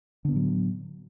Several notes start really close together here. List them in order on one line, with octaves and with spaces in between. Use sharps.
D3 B3 A2 F#3